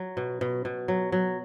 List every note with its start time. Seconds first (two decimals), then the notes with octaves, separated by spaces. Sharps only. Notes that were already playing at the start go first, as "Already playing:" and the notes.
Already playing: F#3
0.17 B2
0.41 B2
0.65 B2
0.88 F#3
1.12 F#3